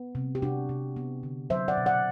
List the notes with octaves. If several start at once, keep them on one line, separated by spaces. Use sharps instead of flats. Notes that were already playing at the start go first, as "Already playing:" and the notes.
Already playing: B3
C3
G4
C3 D4 F#4
C3
B3
D3
F#3 C5 E5
D5 F#5
B2
D5 F#5